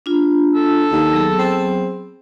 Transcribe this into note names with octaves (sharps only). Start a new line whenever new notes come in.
D4 F4
A4
D#2
F#3 B3 G#4
C4